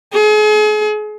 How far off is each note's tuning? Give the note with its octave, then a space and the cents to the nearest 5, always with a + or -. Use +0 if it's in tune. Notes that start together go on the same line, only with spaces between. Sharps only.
G#4 +40